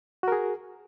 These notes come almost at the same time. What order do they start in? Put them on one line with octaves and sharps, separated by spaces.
F#4 A#4 G#4